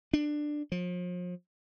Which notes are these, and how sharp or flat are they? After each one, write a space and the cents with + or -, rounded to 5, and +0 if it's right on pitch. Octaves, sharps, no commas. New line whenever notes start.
D4 +15
F3 +40